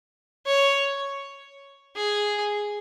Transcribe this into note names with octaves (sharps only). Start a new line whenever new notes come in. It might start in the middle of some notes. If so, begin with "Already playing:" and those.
C#5
G#4